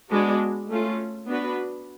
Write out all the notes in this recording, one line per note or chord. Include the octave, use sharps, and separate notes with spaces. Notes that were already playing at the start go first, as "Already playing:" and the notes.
G#3 B3 D4 F#4
A3 C#4 F4
B3 D4 F#4 B4